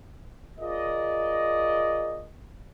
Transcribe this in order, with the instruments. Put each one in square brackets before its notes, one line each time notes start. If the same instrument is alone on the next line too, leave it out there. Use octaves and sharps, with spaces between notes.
[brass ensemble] F4 G#4 A#4 D5 D#5